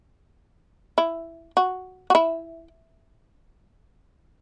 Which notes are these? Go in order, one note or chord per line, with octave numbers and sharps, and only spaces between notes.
E4
F#4
F#4
E4